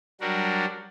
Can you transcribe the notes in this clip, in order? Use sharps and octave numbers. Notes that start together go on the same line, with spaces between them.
F#3 G3 D4 F#4 A#4